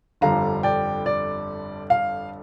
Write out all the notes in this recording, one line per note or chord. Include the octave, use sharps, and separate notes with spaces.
G1 F2 D3 G3 F5 A#5
D5 G5
D5
F5